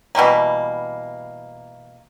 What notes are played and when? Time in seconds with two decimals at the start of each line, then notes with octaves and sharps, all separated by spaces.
0.15 B2 E3 G3 A#3